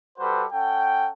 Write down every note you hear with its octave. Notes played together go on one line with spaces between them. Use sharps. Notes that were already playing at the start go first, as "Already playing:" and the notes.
G3 F#4 A4 B4 C5
C#4 A4 F#5 G5